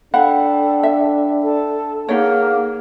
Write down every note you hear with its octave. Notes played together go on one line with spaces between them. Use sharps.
D4 A4 F#5 G5 B5
E5
A4
A#3 D#4 G#4 C#5 F#5